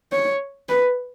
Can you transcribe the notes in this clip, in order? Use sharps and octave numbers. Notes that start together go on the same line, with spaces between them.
C#5
B4